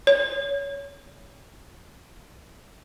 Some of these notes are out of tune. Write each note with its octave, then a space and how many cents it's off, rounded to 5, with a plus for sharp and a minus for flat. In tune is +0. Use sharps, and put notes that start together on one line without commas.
C#5 +25